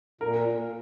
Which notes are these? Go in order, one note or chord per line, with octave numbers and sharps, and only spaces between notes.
A#2 A#4